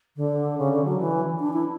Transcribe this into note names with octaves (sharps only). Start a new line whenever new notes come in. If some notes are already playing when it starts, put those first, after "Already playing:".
D3
C#3
D3
F#3
E3
D4
E4